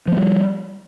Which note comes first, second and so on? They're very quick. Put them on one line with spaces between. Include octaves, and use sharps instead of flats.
F3 A#3 G3